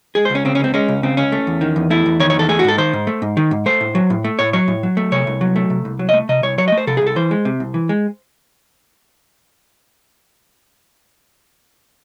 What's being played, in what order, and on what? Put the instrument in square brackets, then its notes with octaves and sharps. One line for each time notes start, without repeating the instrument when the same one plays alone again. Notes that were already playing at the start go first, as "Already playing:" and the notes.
[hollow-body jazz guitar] G#3 G#4
C5
C#2 C#4
C#3 C4
C#4
C#2 C4
G#3 C#4
C#2
C#3 C4
C#2 C#4
A3
E2
D#3
E2
A3 E4
E2
D#3 C#5
C#5
E2 A4
A3 G#4
F#4
G#2 A4
D#3 C5
G#2
A3
G#2
D#3
G#2
A3 C5
A2
F#3
A2
A3
A2 C#5
F#3 C#5
A2
F#3
A3
C3 C#5
C2
F#3
A3
C3
C2
F#3
D#5
A3
C3 D#5
C2 C#5
F#3 C#5
D#5
A3
C5
C3 A4
G#4
C2
A4
E3 C5
G#3
C3
C2
E3
G#3